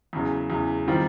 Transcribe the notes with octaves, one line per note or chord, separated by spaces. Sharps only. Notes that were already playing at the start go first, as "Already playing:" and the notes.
E2 C#3 F#3
E2 C#3 F#3
D#3 G3 C4 F4